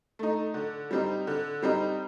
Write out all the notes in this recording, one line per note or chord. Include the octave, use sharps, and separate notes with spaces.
A3 D#4
D3
G3 C4 D#4
D3
G3 C4 D#4